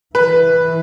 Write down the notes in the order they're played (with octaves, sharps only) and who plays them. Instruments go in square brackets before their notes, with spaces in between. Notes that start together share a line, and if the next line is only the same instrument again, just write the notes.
[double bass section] E3 [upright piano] B4